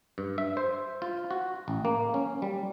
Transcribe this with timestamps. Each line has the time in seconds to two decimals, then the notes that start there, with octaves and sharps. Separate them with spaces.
0.18 G2
0.38 E5
0.57 C5
1.02 F4
1.31 F#4
1.68 A1
1.85 A#3
2.14 C#4
2.42 G3